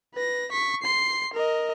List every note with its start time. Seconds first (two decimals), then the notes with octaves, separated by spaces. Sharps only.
0.14 B4 A#6
0.52 C#6 B6
0.82 C6 C7
1.33 A#4 D#5